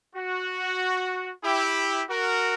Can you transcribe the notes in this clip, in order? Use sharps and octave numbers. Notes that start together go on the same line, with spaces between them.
F#4
E4 G4
F#4 A#4